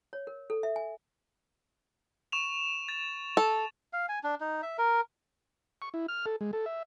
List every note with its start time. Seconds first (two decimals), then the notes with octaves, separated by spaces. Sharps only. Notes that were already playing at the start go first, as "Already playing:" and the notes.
0.13 C#5
0.27 A#4
0.50 A4
0.63 E5
0.76 G#5
2.32 C#6 E7 F7
2.89 A6
3.37 A4
3.93 F5
4.09 G#5
4.23 D4
4.40 D#4
4.63 E5
4.78 A#4
5.82 C#6
5.94 E4
6.08 F6
6.26 A4
6.41 G#3
6.53 A4
6.66 E5